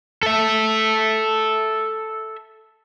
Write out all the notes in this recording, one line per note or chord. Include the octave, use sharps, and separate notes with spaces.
A4 E5